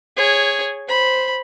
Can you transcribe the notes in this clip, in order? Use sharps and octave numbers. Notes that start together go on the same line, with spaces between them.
G#4 C#5
C5 B5